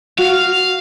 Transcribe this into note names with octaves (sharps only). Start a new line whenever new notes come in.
F#4 F5